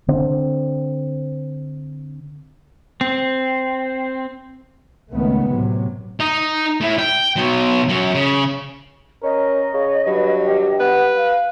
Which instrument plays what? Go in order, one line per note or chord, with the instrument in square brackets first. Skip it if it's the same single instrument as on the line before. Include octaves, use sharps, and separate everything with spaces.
[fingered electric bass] D3 C4
[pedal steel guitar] C4
[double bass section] C#2 D#3 A3 B3
A2 C3 F#3
[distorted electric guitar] D#4
A3 E4
G5
B2 F#3
F#2 F#3
C#3
[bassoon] C#4 [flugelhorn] A#4 [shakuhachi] D#5
[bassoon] C#3 [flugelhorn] C#5
[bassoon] G2 [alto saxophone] F#3 [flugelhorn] B4
[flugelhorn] G4
[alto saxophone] B4 [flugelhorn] F#5
[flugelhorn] F5